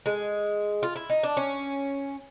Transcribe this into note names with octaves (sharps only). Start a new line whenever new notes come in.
G#3
F4
E4
D#4
D4
C#4